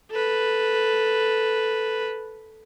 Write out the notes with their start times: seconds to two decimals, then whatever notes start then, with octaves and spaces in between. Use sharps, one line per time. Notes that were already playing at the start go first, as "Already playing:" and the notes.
0.11 A4 B4